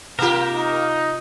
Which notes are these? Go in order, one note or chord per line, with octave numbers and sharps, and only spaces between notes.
C3 A#3 F4 G4 A#4
D#4